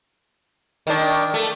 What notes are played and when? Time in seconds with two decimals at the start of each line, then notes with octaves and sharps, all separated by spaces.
0.87 D#3 D4
1.34 A3